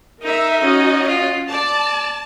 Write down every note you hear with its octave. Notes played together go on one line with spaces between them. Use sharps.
D#4 A#4 E5
C#4 F#4 D#5
F4
D5 A5